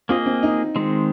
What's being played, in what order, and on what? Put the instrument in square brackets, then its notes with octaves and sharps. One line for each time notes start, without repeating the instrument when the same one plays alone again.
[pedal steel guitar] A#3 G#4 D#5 [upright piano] C4 F4
[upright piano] C4
D#4
[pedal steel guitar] D#3 G#3 C4